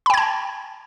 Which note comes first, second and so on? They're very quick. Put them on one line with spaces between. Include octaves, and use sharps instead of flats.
B5 G5 G#6 A5